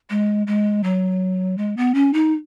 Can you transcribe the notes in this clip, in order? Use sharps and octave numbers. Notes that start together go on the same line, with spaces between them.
G#3
G#3
F#3
G#3
B3
C#4
D#4